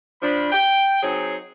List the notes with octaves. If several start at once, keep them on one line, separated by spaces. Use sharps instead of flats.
F3 D4 B5
G5
F#3 C4 D#4 G#4